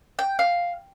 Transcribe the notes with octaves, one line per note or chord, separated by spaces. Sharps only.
G5
F5